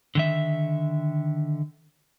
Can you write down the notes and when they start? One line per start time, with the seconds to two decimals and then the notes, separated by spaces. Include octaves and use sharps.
0.15 D3 D#3 E5